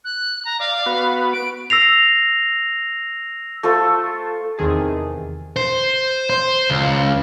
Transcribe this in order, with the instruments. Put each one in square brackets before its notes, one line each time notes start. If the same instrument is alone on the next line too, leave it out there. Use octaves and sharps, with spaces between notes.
[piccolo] F#6
A#5
[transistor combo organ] D5 [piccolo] F5
[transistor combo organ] B3 F#4 B4
[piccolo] D7
[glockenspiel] E6 A#6 C7 F7
[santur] A3 F4 A4 C5
[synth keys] E2 C3 D#3 G#4 A5
[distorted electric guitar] C5
C5
C#2